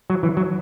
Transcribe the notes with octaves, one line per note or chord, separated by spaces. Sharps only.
F#3
E3
F#3